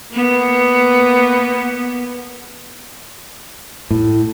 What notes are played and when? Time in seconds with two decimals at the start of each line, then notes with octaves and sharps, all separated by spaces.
0.13 A#3 B3
3.91 A2